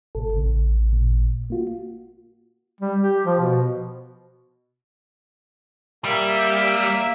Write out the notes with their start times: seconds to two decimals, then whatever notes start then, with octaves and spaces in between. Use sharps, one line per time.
0.15 G1 C2 A2 A4
0.36 A1 C#3
0.93 A#2
1.50 A#3 F4 F#4
2.80 G3
3.00 G4
3.25 F3
3.40 B2
6.05 G3 A#3 E5